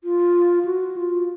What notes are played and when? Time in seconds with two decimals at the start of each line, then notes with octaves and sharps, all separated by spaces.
0.04 F4
0.65 F#4
0.96 F4